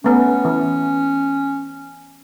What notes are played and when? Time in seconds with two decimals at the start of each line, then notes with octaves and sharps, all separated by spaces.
0.04 A3 B3 C#4
0.45 E3